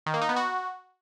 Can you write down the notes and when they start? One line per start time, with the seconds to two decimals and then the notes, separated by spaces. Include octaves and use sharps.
0.06 D#3
0.14 A#3
0.21 D#4
0.29 B3
0.36 F#4